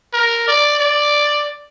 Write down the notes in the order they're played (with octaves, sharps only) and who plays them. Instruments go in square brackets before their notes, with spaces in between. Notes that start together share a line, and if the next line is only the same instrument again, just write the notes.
[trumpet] A#4
D5
D5